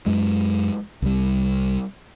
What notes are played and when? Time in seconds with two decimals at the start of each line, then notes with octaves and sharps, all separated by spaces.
0.06 F#2 G#3
1.02 C2 G3